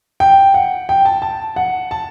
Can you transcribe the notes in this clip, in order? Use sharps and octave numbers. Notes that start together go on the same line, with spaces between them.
G5
F#5
G5
A5
A5
F#5
A5